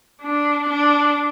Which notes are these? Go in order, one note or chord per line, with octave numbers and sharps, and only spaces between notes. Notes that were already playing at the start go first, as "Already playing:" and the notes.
D4
D4